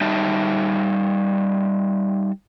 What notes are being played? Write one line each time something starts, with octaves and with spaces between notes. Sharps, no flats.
G3 D#4 E5 A5